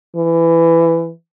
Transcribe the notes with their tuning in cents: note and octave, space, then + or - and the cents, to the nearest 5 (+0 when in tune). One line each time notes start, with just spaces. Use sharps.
E3 +15